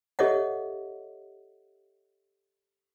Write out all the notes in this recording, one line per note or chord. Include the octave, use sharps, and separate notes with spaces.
G4 A4 C#5 D#5 E5 F#5